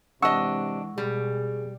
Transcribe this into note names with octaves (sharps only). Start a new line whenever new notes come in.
C3 E3 G#3 D4 D#5 F#5 C#6 E6
B2 G3 G#4